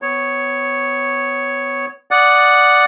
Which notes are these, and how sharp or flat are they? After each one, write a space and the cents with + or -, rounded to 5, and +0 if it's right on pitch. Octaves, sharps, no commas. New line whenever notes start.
B3 +30 C#5 +0
D5 +0 F#5 +0 D#6 +0